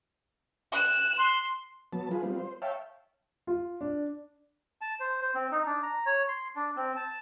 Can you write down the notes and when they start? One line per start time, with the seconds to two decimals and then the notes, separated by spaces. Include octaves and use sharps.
0.72 F#6 E7
1.18 C6
1.93 F#3 B3 A5
2.11 F4 G#4 B4
2.23 G3 B3 C4 F4
2.39 C5
2.62 C#5 E5 F5 G5 A5
3.47 F4
3.81 D4
4.81 A5
5.00 C5
5.22 C5
5.35 C4
5.52 D#4
5.66 D4
5.83 A#5
6.06 C#5
6.28 C6
6.56 D4
6.76 C4
6.96 A5